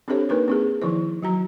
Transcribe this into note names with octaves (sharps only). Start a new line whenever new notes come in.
C4 D4 G4 A4 C5 C#5
A#3 D#4 A#4 B4
C4 D#4 G#4
D#3 F3 D#4 E4 C5
F#3 F#4 A#5